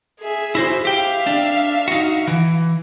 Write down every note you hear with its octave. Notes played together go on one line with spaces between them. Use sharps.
G#4 E5
E4 F#4 C5
G4 E5 F5 G5
D4
D#4 F#4
E3